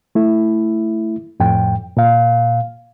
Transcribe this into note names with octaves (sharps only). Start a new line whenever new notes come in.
A3 E4
F2 A2 G5
A#2 F5